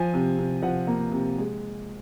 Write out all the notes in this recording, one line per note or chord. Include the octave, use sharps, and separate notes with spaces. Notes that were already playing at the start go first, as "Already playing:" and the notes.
Already playing: F3 G#5
C3
C3
F3 F#5
A#3
C3
G#3